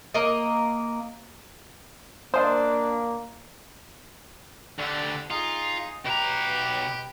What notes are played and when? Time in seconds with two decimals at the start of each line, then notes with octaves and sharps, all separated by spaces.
0.14 A#3 A#4 D#5
2.34 A#3 D4 C5 D#5 A5 D#6
4.79 D2 D3 G4 A4
5.30 D#4 F4 G#4
6.05 B2 G4 B4 G5 A#5